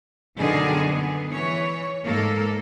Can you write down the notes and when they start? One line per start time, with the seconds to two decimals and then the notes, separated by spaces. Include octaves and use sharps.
0.36 F#2 B2 D3 D#3 G#4
0.88 B3
1.31 E3 C#5
2.03 G#2 A#3 A4